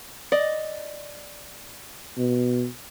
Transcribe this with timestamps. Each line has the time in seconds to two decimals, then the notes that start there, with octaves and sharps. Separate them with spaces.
0.32 D5 D#5
2.18 B2